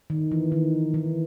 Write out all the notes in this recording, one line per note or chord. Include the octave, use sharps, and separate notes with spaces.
D#3
E3
D#3
E3